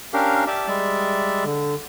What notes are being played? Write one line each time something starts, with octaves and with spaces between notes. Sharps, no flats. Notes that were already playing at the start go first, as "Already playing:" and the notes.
C#4 D4 G4 A#4 F5
G4 D5 E5 A5 D6
G3 G#3 D5 E5
D3